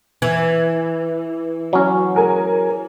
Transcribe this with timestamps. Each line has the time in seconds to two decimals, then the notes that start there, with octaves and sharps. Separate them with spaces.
0.22 E3 G#6
1.73 F#3 C#4
2.15 G#4 A#4 G#5